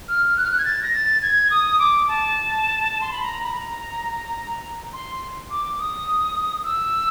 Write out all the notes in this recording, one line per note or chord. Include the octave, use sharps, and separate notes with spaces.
F6
F#6
F6
F#6
G#6
A6
A#6
A6
G#6
D#6
D6
A5
C6
B5
A#5
B5
A#5
C6
D6
D#6
E6